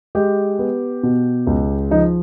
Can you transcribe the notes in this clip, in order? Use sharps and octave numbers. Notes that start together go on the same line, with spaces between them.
G#3 G4
B3
B2
C#2
F3 D#4